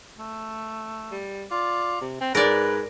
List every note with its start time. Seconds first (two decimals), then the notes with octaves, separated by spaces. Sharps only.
0.18 A3
1.12 G3
1.51 F4 D5
2.01 C3
2.21 C4
2.35 G#2 A#4 B4 D5